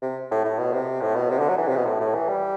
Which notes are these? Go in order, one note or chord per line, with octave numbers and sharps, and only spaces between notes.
C3
A2
A2
B2
C3
A2
B2
C3
D3
F#3
E3
C3
B2
A2
A2
E3
G3